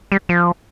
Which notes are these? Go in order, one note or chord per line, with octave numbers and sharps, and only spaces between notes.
G3
F3